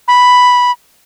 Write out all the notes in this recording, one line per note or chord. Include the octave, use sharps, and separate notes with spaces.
B5